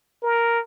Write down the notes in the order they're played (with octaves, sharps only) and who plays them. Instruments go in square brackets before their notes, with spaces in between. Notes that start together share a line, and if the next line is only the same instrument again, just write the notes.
[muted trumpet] A#4